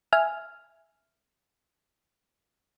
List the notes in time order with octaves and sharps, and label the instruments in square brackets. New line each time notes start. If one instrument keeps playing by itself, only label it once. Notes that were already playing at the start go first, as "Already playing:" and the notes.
[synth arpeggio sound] E5 G#5 F6